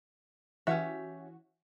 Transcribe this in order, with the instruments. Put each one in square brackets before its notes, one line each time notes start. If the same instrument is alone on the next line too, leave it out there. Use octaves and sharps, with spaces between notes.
[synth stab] E3 F#4 [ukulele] C#4 G4 E5